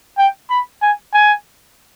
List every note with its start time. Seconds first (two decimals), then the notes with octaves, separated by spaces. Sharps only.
0.18 G5
0.50 B5
0.82 G#5
1.13 G#5